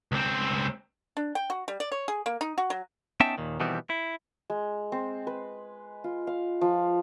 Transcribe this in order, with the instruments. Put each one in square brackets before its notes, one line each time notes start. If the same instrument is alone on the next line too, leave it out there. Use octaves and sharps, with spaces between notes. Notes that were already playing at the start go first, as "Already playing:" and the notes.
[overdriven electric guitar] C#2 C4
[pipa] D4
G5
F#4
G3
D5
C#5
G#4
A#3
D#4
F#4
F#3
[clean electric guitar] B3 C#4 D#4 E5 G5 A5
D#2 A#2 D#3
B2 D#3 E3 G3 B3 C4
E4
[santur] G#3
C4
B4
F4
F5
F3